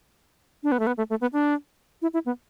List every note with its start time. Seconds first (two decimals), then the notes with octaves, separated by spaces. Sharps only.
0.63 D4
0.72 B3
0.80 A3
0.87 B3
0.98 A3
1.10 A3
1.21 B3
1.33 D4
2.02 E4
2.14 E4
2.26 B3